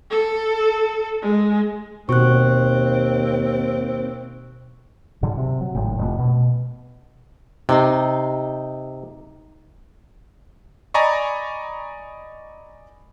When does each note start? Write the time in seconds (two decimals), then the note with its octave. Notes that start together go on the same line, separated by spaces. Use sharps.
0.10 A4
1.22 G#3
2.09 D#2 B2 C4 F#4 C#6 F#6
5.23 G#2 D3 F#3
5.37 C3
5.61 F#3
5.75 G#1 A2
5.99 F1 A3
6.18 B2
7.69 C3 D#4 D#5 C6
10.94 D5 D#5 G#5 A#5 B5 C#6